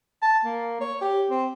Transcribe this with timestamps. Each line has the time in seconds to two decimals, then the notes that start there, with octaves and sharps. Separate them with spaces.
0.22 A5
0.45 A#3
0.81 C#5
1.01 G4
1.30 C4